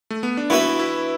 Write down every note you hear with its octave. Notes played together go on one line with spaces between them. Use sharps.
A3
B3
D4
E3 B3 E4 F#4 B4 E5
E4